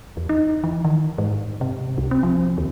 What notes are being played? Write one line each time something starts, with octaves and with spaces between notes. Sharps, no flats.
E2
D#4
E3
D#3
G#2
C3
C2
C4
F3
D#2